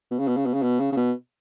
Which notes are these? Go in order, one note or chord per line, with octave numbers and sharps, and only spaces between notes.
B2
C#3
B2
C#3
B2
C#3
B2
C#3
C#3
B2